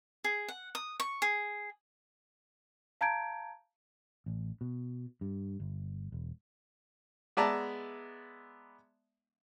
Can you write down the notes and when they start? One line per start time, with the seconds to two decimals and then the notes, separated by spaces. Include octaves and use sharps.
0.24 G#4
0.48 F#5
0.75 D#6
1.00 C#6
1.22 G#4
3.01 F5 A5 A#5 G6 G#6 D7
4.26 A1
4.61 B2
5.21 G2
5.60 G1
6.12 E1
7.37 G#3 B3 D5 E5 A5 A#5